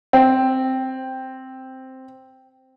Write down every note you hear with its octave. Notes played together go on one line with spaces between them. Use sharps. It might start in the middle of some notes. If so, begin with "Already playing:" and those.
C4 G5